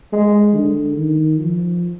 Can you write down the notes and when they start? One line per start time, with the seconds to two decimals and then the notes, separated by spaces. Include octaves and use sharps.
0.13 G#3
0.55 D3
0.95 D#3
1.38 F3